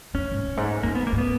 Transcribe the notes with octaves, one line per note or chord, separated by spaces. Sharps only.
F#2 C#4
G#2
F#2
G#2
F#2 A#3
B3
A#3
G#2
B3